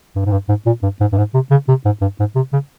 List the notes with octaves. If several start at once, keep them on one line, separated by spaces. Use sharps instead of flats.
G2
G#2
G2
G#2
A#2
G2
G#2
G2
G#2
C3
C#3
C3
G#2
G2
G#2
C3
C#3